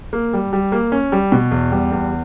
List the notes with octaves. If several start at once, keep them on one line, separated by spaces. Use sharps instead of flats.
A#3
G3
G3
A#3
C#4
G3
B2
E2
G3
E2